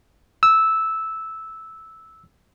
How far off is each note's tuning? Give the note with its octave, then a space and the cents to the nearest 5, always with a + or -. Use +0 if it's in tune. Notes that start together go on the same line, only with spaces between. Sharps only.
E6 -10